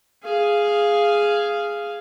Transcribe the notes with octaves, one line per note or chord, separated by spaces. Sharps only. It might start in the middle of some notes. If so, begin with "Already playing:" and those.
G#4 F5